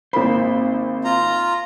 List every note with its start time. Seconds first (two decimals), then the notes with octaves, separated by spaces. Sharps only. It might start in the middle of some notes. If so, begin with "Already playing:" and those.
0.13 G#1 A#3 C4 C5 B5
1.05 F4 A#5